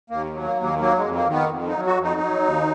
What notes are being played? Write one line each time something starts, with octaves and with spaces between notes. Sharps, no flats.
D#2 A#3
F#3
A#3
D#2
A#3
F#3 A#3
G#3
F2
A#3
D#3
B3
F2
D#4
F#3
F#4
F2
D#4
F#3
D#2